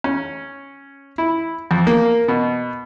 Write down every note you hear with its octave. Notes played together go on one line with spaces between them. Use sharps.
C#4
E4
F2
A#3
B2